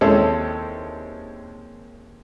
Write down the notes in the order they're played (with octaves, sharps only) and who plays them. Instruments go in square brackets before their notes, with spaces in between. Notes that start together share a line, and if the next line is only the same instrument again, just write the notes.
[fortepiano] D#2 G#3 C4 C#4 E4 A4